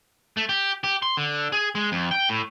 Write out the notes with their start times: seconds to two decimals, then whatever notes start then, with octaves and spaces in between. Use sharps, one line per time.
0.37 A3
0.49 G4
0.84 G4
1.02 C6
1.17 D3
1.52 G#4
1.75 G#3
1.92 F2
2.11 G5
2.29 A2